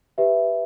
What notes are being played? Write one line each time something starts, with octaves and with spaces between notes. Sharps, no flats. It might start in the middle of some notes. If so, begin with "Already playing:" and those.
G4 B4 E5